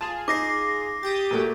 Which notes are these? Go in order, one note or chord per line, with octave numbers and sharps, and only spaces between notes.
F4 G#4 A5
D#4 D6 A#6 C7
G4 D#6 G6 A6
A#2 A3 F#4